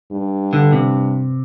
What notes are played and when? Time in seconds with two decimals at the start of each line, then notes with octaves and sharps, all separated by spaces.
0.12 G2
0.53 D3
0.72 C3